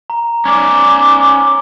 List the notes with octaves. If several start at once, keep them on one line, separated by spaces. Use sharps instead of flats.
A#5
C#4 D5
G7
D6